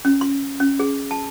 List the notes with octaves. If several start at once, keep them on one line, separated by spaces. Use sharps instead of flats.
C#4
C6
C#4
G#4
A5